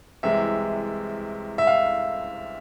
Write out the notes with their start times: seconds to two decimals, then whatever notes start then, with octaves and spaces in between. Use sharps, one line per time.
0.23 C2 C3 E3 G#3 E5
1.58 E5
1.67 F5